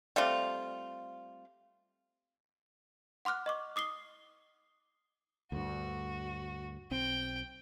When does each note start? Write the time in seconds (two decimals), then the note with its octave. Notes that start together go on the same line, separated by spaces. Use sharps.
0.16 G3 A3 C4 F4
3.25 F#5 C6 D6 F6 F#6
3.46 D#5 C#6 D6
3.76 D6 D#6 C7 G7
5.52 D2 G2 F#4
6.91 B1 C4 G5